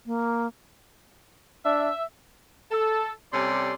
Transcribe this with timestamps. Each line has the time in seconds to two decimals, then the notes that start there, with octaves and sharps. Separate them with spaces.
0.06 A#3
1.65 D4 E5
2.71 A4
3.32 C3 G3 C#4 A4 D5 C6